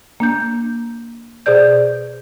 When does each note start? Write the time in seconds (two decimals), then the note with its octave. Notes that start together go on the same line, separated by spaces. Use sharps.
0.20 A#3 D4 G6
1.46 B2 G#4 C5 D5 G6